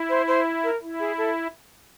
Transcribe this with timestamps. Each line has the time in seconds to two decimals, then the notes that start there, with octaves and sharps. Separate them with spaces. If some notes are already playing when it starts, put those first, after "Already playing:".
Already playing: E4
0.09 C5
0.28 C5
0.64 A#4
0.82 E4
1.00 G#4
1.18 A4